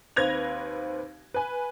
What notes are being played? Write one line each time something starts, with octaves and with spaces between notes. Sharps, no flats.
D#2 C4 B4 G#6 A#6 F7
B4 G#5